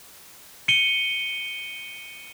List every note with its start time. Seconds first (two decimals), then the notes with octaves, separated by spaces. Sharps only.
0.68 C#7 D#7 G7